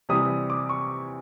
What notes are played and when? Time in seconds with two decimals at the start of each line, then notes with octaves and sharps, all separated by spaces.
0.09 C3 E3 G3 D#6
0.50 D6
0.69 C#6